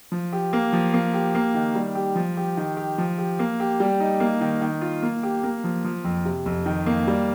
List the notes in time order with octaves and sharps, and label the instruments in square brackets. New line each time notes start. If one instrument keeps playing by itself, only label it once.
[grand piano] F3
G4
A#3
F3
A#3
G4
A#3
D#3
G3
G4
F3
G4
D#3
G4
F3
G4
A#3
G4
G3
D#4
A#3
D#3
D#3
F4
A#3
G4
A#3
F3
F3
F2
C3
F2
D#3
A#3
G3